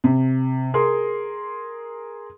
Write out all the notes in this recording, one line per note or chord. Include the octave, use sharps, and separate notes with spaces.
C3
G#4 A#4 C6